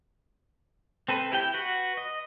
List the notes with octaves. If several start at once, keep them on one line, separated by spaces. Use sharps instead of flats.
C4 A4 B4
E4 G4 G5
F#4 B4 F#5
D#5